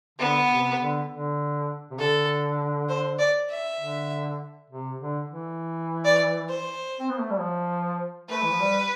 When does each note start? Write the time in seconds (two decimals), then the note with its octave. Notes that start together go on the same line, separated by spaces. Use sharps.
0.19 D3 B3
0.50 C3
0.79 D3
1.10 D3
1.91 C3
1.99 D3 A4
2.89 C5
3.19 D5
3.50 E5
3.80 D3
4.70 C3
5.00 D3
5.30 E3
6.05 D5
6.49 C5
7.00 C4
7.09 B3
7.20 A3
7.30 G3
7.40 F3
8.29 A3 B4
8.43 E3
8.52 F3
8.60 G3